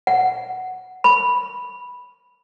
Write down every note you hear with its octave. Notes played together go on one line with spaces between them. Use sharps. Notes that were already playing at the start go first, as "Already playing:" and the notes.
F#5
B5